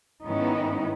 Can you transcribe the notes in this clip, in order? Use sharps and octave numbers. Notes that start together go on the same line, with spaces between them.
G#2 D#3 B3 C#4 D#4 E4